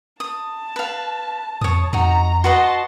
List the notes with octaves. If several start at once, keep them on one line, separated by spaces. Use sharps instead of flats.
A5 D#6
B4 F5
F2 C#5 D#6
F2 D#4 F#4 A#5
F#4 B4 D#5 A5 C6